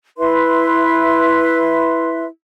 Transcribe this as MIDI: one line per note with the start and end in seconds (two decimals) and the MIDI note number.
0.18 2.24 64
0.18 2.24 71
0.18 2.24 76
0.18 2.24 84